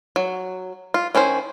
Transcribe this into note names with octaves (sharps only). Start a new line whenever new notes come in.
F#3
F4
D#3 C#4 E4 C5